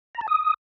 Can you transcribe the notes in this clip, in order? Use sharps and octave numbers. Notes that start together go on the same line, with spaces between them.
A#5
A5
D#6